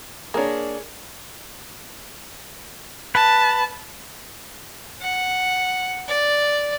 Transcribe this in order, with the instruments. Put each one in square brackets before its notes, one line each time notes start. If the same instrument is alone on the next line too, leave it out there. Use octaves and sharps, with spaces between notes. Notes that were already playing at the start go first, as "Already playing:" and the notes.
[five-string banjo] A#3 D4 [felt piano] G#4 A#4 C#5
[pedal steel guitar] B4 [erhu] A5
[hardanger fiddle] F#5
D5